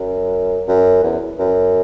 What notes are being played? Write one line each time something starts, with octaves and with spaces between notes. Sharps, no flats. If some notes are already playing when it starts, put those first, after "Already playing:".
Already playing: F#2
F#2
E2
F#2